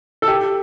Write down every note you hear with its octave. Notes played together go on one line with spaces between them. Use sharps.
A4
G4